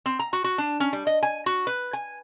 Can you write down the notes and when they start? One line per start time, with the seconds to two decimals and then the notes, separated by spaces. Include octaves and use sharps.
0.06 C4
0.19 A#5
0.33 F#4
0.44 F#4
0.58 D4
0.80 C#4
0.93 G3
1.07 D#5
1.23 G#5
1.46 F#4
1.67 B4
1.93 G#5